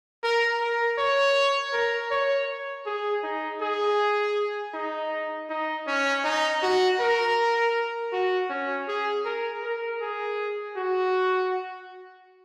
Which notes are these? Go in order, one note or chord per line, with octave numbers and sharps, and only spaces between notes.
A#4
A#4
C#5
A#4
C#5
G#4
D#4
G#4
D#4
D#4
C#4
D#4
F#4
A#4
F#4
C#4
G#4
A#4
A#4
G#4
F#4